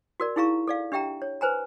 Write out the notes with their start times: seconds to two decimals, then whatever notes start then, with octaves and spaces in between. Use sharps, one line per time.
0.20 F#4 A#4 D5
0.36 D#4 E4 G#4 F5 A#5 C#6
0.67 A4 D5 F5
0.92 D4 G4 E5 G5 A#5
1.22 C#5
1.41 B4 C5 G#5 A#5